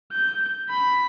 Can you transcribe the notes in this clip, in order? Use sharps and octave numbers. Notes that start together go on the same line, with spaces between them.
G6
B5